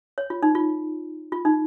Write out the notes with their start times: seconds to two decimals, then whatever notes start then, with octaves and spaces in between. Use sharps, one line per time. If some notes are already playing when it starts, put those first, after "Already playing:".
0.18 C#5
0.30 F4
0.43 D#4
0.55 F4
1.32 F4
1.45 D#4